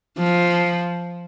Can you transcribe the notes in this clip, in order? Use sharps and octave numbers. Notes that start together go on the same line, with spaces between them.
F3